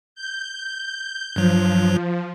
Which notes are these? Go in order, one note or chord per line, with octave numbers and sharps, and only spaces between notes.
G6
G2 F3 F#3